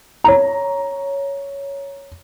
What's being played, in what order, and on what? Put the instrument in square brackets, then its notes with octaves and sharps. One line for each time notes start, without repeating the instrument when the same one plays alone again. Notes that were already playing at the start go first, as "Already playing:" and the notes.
[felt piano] C#5 A#5